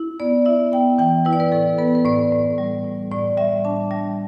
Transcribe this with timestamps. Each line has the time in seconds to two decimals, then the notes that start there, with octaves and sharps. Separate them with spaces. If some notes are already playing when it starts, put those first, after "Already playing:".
Already playing: E4
0.20 B3 D5
0.45 E4 E5
0.72 B3 G5
0.98 E3 G5
1.25 E4 B4
1.33 D5
1.40 B4
1.52 A2 A4
1.78 B3 B4
1.95 B4
2.05 A2 D5
2.32 A2
2.58 G3
2.85 A2
3.12 A2 D5
3.37 G3 E5
3.65 D4 A5
3.91 G3 A5